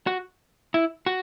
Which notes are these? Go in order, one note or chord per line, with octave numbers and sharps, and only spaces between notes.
F#4
E4
F#4